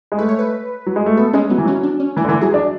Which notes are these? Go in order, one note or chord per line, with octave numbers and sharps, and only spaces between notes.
G#3
A3 B4
C#5
B4
F#3
G#3
A3
B3 A4
G#3 C#4
F#3 B3
E3
F#3 C#4
D4
C#4
E3 D4
D3
E3 E4
F#3 G#4
D4